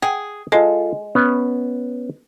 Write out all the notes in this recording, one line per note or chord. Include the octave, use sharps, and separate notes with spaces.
G#4 F#5 G5
G#3 F4 A4
B3 C#4